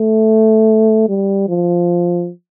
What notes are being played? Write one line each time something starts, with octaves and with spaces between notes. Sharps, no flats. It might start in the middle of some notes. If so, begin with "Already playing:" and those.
Already playing: A3
G3
F3